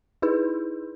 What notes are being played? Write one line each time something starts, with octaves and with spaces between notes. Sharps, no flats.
D#4 E4 G#4 B4